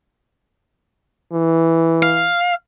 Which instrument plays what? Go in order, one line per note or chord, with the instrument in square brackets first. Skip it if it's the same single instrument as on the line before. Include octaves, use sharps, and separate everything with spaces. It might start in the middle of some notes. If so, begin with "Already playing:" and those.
[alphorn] E3
[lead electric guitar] F5